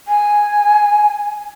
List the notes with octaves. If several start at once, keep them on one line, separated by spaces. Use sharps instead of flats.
G#5